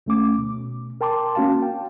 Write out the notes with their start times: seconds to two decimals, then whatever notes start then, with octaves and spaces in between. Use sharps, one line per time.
0.06 D2 A3 C#4 D6
0.38 B2
1.01 A#4 G5 A5 C6 D6
1.35 A#3 C#4 F#4 F5 A5
1.62 G5